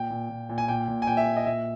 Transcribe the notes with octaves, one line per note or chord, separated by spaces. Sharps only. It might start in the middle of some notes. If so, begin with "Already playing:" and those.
Already playing: A#2 G5
A#2
A#2
A#2
G#5
A#2 G5
A#2
G#5
A#2 G5
E5
A#2
D#5
A#2 E5